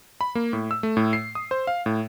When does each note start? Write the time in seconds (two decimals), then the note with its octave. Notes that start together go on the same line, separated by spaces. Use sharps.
0.21 B5
0.35 A#3
0.53 A2
0.71 E6
0.83 A3
0.97 A2
1.13 C7
1.35 D#6
1.51 C5
1.67 F5
1.86 A2